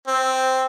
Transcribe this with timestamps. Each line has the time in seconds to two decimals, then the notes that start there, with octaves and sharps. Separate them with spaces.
0.07 C4